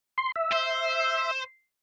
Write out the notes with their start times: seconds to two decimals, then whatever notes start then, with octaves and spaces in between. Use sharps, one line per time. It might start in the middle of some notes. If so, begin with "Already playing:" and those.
0.18 C6
0.36 E5
0.53 C5